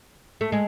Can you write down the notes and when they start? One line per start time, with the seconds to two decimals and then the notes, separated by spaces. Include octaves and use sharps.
0.41 A3
0.52 G#3